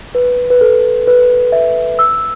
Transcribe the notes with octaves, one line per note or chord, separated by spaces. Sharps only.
B4
B4
A4
B4
E5
E6